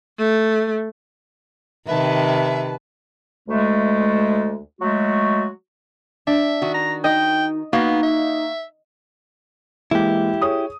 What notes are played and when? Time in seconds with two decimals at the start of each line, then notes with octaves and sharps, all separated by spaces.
0.18 A3
1.87 C3 D#3 B4 E5 A5
3.48 D2 G#3 A3
4.81 F#3 G#3 A3 F#4
6.27 D4 E5
6.62 D#3 F#4
6.74 A#5
7.04 D#4 D#5 G5 D#6
7.73 A#3 B3 D#4 F#4 F5
8.03 E5
9.91 E3 G#3 A#3 E4 G4
10.42 G#4 C#5 D#6